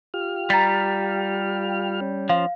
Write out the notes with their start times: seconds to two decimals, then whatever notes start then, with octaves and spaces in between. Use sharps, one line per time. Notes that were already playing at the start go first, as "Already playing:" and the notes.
0.14 F4 G4 F6
0.50 G3 A#5 A6 B6
2.01 C#4
2.29 F3 F5